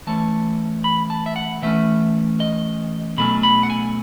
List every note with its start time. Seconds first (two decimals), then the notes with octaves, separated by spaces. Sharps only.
0.07 E3 A3 C#4 A5
0.84 B5
1.10 A5
1.26 E5
1.36 F#5
1.62 E3 A3 C#4 E5
2.40 D#5
3.17 B2 F#3 A3 C#4 B5
3.43 B5
3.63 F#5
3.70 G#5